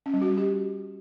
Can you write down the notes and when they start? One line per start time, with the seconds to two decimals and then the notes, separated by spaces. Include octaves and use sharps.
0.06 C#4
0.14 G3
0.21 F#4
0.29 G3
0.37 G4